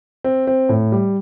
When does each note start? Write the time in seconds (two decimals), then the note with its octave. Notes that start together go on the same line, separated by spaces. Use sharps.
0.24 C4
0.47 C4
0.69 A2
0.92 G3